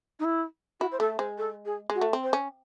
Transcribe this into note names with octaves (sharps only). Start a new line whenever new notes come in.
D#4
E4
E4 F#4
C5
A3 A4
G#3 C5
A4
G#4
G#3
F#4
A3
C4
C5
C#4